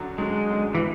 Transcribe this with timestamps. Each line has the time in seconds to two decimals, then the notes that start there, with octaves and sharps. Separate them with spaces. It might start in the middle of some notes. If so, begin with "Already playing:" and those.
Already playing: F#2 D3 F#3
0.18 F#2 D3 F#3 G#3
0.50 F#2 D3 F#3
0.75 E3